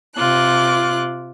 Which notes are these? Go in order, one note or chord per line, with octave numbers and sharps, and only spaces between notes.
C3 F4 D6 F#6